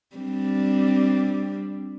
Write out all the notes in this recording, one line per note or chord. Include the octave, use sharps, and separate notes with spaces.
G3 C4 D4